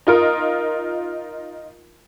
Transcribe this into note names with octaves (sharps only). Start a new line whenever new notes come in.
D#4 F4 A#4